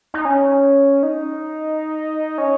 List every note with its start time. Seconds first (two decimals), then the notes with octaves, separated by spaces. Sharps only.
0.14 D#4
0.25 C#4
1.03 D#4
2.38 C#4